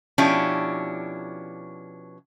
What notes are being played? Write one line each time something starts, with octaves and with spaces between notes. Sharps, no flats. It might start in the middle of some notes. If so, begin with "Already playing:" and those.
B2 F3 C#4 D4 E4 G4